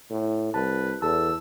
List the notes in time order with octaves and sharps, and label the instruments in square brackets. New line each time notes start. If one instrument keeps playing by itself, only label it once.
[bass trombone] A2
[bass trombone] C2 [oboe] B4 [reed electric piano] A5
[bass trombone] E2 [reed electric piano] A4 A5 [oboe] E6